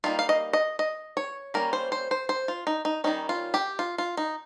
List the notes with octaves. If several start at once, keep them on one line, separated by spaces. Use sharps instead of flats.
G3 A#3 D#4 F4
F5
D#5
D#5
D#5
C#5
G3 A#3 C#4 A#4
C5
C5
C5
C5
F4
D#4
D#4
D#3 G3 C#4 D#4
F4
G4
F4
F4
D#4